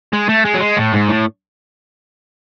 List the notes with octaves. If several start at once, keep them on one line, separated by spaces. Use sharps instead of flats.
G#3
A3
G#3
F#3
G#3
A2
G#2
A2